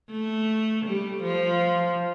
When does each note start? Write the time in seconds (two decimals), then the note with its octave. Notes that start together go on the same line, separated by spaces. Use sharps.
0.10 A3
0.85 G3
1.23 F3